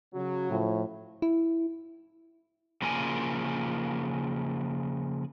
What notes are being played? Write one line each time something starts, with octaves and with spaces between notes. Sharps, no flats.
C#3 F#3 F#4
A2 F3
E4
C#3 F3 A#3 A#4 D5 G#5